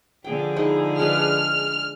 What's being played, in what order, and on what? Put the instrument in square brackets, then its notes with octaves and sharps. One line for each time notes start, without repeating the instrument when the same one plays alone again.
[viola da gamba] D3 F3 G#4 [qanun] G5
[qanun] G#3 D#4 E4
[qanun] G#3 D4 B4 [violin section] F6